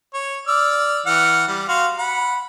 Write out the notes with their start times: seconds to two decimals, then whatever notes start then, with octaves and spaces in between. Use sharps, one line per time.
0.14 C#5
0.48 D5 E6 F6
1.06 E3 F#5 F6
1.48 G3
1.69 F#4 F5 C6
1.99 F#5 B5